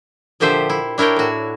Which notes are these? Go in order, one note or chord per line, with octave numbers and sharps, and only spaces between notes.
A#2 D3 F3 G4 C5 E5
E4
D4 E4 A#4 C#5 G5
A2 F#4